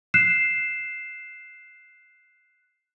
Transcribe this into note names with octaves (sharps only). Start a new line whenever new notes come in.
F#6 C7 E7